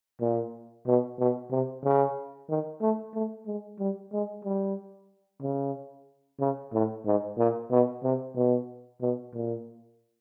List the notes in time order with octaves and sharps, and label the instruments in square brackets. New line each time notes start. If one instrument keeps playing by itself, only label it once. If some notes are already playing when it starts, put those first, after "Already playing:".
[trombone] A#2
B2
B2
C3
C#3
D#3
A3
A3
G#3
G3
G#3
G3
C#3
C#3
A2
G#2
A#2
B2
C3
B2
B2
A#2